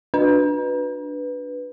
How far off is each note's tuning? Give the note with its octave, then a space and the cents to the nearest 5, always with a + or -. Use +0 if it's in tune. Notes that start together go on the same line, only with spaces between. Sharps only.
D4 +0 B4 +0